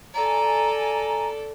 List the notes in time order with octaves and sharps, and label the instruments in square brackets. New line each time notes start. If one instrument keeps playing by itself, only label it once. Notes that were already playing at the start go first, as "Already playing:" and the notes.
[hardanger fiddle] A4 D5 [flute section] G#5 A#5